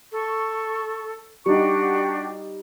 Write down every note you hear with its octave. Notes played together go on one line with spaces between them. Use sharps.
A4 C#6
G3 D4 D#4 F#4 G4 C#6